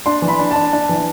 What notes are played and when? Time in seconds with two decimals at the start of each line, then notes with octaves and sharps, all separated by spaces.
0.06 D4 C6
0.22 E3
0.28 B5
0.39 D4
0.51 D4 A5
0.73 D4
0.89 E3